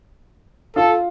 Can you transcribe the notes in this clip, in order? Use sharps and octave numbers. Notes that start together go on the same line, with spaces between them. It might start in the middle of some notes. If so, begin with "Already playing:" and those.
F4 A4